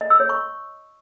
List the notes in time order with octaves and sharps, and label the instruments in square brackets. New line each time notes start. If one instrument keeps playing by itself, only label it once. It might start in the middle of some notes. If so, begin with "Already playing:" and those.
[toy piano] D#5
E6
C#5
C#6